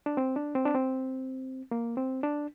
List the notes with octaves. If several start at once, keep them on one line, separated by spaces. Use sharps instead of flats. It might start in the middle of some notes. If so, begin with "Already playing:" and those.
D4
C4
D4
C4
D4
C4
A#3
C4
D4